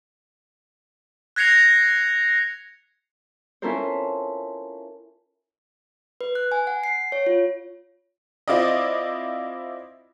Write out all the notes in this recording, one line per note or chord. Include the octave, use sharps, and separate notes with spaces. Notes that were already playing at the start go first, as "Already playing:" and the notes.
F#6 G#6 A#6 C7 C#7 F7
C#4 E4 F4 A4 A#4 C5
B4
F#6
G#5
F#5
C7
C#5
F4
C4 E4 F4 D5 D#5